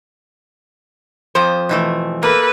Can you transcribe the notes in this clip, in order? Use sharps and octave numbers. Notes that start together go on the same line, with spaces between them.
F2 F3 C5
B2 E3 A3
A#3 A4 B4